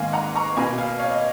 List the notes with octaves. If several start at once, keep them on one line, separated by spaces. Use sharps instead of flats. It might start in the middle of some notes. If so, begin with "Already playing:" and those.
Already playing: G#2 D#3 A#3 F5 G#5
F#5 A#5
A#5 C#6
B2 A#3 G#5 B5
F5 G#5
C#5 F5
D#5